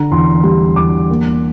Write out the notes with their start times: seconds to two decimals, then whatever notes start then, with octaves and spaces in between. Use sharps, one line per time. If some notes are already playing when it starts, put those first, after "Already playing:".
Already playing: D3 A#5
0.11 E2 C6
0.43 G3 C6
0.76 E2 D6
1.10 A#3